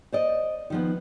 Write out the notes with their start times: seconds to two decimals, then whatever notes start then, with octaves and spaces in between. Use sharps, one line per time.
0.12 C5 D5 D#5
0.70 D#3 F3 B3